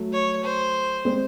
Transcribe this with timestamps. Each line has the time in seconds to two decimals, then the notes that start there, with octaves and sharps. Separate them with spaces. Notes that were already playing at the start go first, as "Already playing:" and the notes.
Already playing: F#3 A3
0.13 C#5
0.43 C5
1.05 G#3 C4